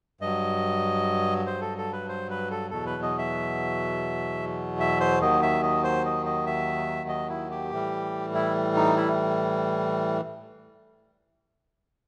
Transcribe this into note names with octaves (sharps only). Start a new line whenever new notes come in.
G2 F#3 D#5
C5
A4
A4
B4
C5
B4
A4
E2 B2 F#3 A4
B4
D#5
E5
E5
C5
D#2 D#3 F#3 D#5
E5
D#5
C5
D#5
D#5
E5
D#5
E4
G4
A2 E3 G3
E4
D#4
E4